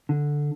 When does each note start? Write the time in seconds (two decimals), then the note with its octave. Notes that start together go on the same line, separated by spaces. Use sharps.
0.09 D3